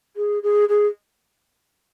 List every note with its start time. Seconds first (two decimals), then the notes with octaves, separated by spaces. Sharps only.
0.16 G#4
0.43 G#4
0.69 G#4